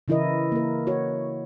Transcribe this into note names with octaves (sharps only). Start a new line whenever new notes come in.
C#3 E3 E4 A#4 D#5
A#3 A#4
F#4 C#5